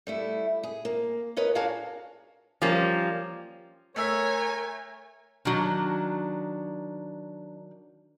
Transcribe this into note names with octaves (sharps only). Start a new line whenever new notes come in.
G3 A3 E4
G#4
A#3
C#4 A#4 B4 D#5
D4 F#4 G#4 D5 F5 A#5
F3 G3 A#3 C#4
A3 A#4 C#5 G#5 E6 B6
D#3 F#3 D4